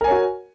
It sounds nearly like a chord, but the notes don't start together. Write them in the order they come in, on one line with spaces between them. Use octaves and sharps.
A#4 G#5 C#5 F#4